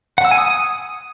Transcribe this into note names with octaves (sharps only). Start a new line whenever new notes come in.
F#5
E6
G#5
D#6